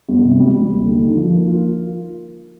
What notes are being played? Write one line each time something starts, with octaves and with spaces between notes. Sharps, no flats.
G1
C3
G3
G3
D#2
D3
D#4
F3
A#3
F4